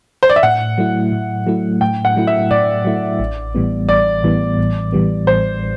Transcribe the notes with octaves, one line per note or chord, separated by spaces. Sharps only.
C5
D5
E5
A2 F#5
F#3 A3 E4
A2
F#3 A3 E4
A2 G5
F#5
F#3 A3 E4
E5
A2 D5
F#3 A3 E4
A1
A2 E3 G3 B3
A1 D5
A2 E3 G3 B3
A1
A2 E3 G3 B3
A1 C5